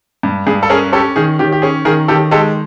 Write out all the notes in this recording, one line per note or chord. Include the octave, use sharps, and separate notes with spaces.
G2
G2 G#4
A4
C#4 G#4 A#4
C#4 G4 A4
D#3 G#4
D#3 G4
G4
C#4 G#4
D#3 G#4 A#4
D#3 G4 A4
G#3 G4 A4